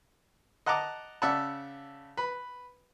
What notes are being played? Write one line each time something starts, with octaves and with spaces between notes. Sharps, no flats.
D#5 F#5 A5 A#5 D6
C#3 D5 E5 F#5 A5
B4